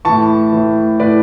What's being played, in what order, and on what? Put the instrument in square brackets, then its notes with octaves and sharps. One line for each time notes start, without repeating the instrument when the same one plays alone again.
[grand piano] A2 E3 A5 C#6
A2 E3
A2 E3 B4 D5